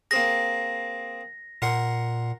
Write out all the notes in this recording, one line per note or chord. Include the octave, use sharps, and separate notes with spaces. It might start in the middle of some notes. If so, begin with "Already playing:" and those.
A#3 C4 G#4 A#6
A#2 A#4 F#5 C6